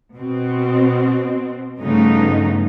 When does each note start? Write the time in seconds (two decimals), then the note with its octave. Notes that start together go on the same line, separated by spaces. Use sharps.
0.17 B2 C4
1.79 G2 C#3 F3 A3 B3 D#4